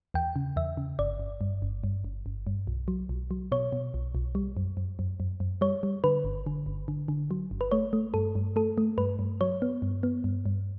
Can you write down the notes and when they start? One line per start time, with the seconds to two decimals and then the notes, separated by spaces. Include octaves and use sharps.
0.14 E2 G5
0.36 C#3
0.56 E2 E5
0.77 C#3
0.99 G1 D5
1.19 G1
1.41 G2
1.62 G1
1.84 G2
2.04 G1
2.26 G1
2.47 G2
2.67 B1
2.88 F#3
3.09 B1
3.31 F#3
3.52 B2 C#5
3.72 B2
3.94 B1
4.15 B1
4.35 G3
4.57 F#2
4.77 F#2
4.99 F#2
5.20 F#2
5.40 F#2
5.61 G3 C#5
5.83 G3
6.04 D3 B4
6.24 G1
6.46 D3
6.66 G1
6.88 D3
7.08 D3
7.31 F#3
7.51 G1
7.61 B4
7.71 A3 C#5
7.93 A3
8.14 G2 A4
8.35 G2
8.56 A3 A4
8.78 A3
8.98 G2 B4
9.19 G2
9.41 F#3 C#5
9.62 B3
9.82 G2
10.03 B3
10.24 G2
10.46 G2